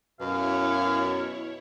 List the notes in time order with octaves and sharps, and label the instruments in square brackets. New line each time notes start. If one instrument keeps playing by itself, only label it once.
[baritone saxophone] F#2 [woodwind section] B2 [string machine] E4 C#5 [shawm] F5